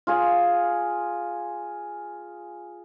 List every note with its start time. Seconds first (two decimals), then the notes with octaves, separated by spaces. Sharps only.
0.07 F4 G#4 G#5